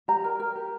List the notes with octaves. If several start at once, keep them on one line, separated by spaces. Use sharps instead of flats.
G4 A#5
A#4
A#4
G4